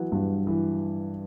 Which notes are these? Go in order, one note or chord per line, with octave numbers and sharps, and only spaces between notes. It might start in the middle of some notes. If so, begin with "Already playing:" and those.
Already playing: E3 F#3 B3
G2
E3